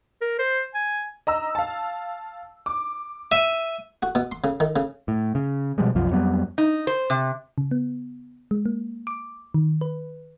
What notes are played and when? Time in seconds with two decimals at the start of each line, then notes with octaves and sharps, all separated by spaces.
0.21 A#4
0.39 C5
0.75 G#5
1.27 D#5 A#5 E6
1.55 F5 A5
2.66 D6
3.32 E5 D#7
4.02 F#4
4.15 B2
4.32 C6
4.44 C#3
4.60 D#3
4.76 C#3
5.08 A2
5.35 C#3
5.78 B2 F3 G3 G#3
5.95 C2 F#2 F3
6.11 F2 F#3 G3 B3
6.58 D#4
6.87 C5
7.10 C3
7.58 C#3
7.71 B3
8.51 G#3
8.66 A#3
9.07 D6
9.54 D#3
9.81 B4